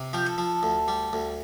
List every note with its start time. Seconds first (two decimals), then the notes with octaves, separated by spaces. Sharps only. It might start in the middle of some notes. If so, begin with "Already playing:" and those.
Already playing: C3
0.13 F3 G4
0.26 A4
0.38 F3
0.63 D2
0.88 G3
1.13 D2